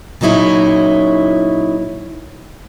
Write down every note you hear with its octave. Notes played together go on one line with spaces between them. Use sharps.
A#2 C#3 F#3 D#4 E4 C#5